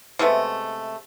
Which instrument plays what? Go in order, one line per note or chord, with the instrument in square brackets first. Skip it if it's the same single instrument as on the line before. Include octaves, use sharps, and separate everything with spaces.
[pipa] C3 G#3 A3 B3